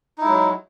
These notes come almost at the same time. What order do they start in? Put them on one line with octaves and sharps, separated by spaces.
D#4 E4 G#3 F#3